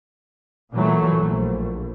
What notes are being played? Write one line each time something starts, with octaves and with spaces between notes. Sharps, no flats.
A#2 E3 F#3 A3
A#1